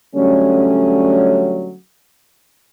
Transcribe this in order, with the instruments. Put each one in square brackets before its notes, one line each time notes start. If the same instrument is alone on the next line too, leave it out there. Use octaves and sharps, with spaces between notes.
[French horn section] D3 F#3 G3 A3 C#4